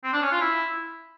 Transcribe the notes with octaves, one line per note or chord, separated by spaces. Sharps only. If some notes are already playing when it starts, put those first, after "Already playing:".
C4
D4
C#4
F4
E4